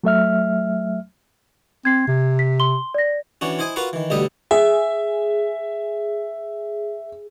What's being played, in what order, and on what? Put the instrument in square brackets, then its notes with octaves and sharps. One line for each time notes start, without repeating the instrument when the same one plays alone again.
[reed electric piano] F#3 A3 E5 F6
[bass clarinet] C4 [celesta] G#6 C7
[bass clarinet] C3
[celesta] B6
C6 G7
D5 A#6
[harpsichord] E3 C#4 D4 F#4
E4 C5 D#5 G#5
F4 F#4 A#4 B4 F5
D#3 E3
A1 B2 D3 G3 D#5 E5
[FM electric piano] G#4 [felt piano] E5